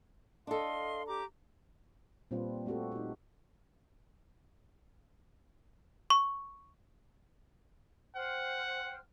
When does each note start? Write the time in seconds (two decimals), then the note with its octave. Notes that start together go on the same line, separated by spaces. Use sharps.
0.47 D4 A4 D#5 F5 C6
1.07 G4 A#5 D6
2.31 A#2 G3 C4 D4 F4 B4
2.66 A3 C4 F#4 G4 A4
2.92 D#4 G4
6.10 C#6
8.15 C5 F#5 G5 F6